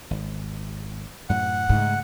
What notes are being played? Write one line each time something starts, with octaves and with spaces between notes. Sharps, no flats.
G#1
F#2 A2 C3 F#5
G#2 C#3 A3